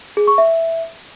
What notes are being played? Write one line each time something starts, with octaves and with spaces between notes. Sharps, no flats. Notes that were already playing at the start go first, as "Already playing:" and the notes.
G#4
C#6
E5